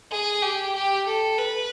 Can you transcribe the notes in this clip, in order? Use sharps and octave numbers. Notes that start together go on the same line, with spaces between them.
G#4
G4
G4
A4
B4